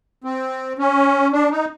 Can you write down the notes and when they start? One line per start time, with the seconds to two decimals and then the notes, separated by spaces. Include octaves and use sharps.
0.24 C4
0.79 C#4
1.33 D4
1.51 D#4